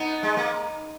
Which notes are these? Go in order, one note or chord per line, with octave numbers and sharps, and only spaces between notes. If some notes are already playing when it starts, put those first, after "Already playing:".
Already playing: B3 D#4
G#3
A#3